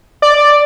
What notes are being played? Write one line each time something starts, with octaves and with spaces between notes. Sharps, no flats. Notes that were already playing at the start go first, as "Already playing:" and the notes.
D5